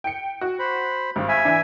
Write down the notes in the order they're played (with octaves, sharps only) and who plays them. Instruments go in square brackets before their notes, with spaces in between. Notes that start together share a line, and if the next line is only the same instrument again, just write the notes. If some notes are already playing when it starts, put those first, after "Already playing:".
[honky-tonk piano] G5 C#7
F#4
[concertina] C5 B5
[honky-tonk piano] G#1 G2
[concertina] E5 G#5
[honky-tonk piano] E3 D4